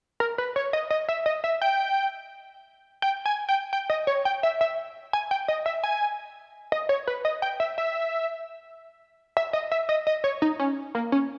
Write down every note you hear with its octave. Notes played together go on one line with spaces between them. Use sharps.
A#4
B4
C#5
D#5
D#5
E5
D#5
E5
G5
G5
G#5
G5
G5
D#5
C#5
G5
E5
E5
G#5
G5
D#5
E5
G#5
D#5
C#5
B4
D#5
G5
E5
E5
E5
D#5
E5
D#5
D#5
C#5
D#4
C#4
A#3
C#4